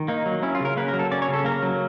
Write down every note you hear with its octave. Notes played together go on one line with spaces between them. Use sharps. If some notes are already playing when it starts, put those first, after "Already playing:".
Already playing: D#3
A#3 D#4
F#3
C#4 E4
F4
C#3 A#4
A#3 B4
A#4
F#3
A4
C#4 D5
C#5
C#3
A4
A#3 A#4
F#3